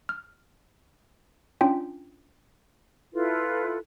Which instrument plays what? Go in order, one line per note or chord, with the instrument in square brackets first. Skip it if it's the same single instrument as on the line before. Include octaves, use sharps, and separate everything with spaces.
[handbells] F6
C#4 D4 F4 G5
[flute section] E4 F4 A4 B4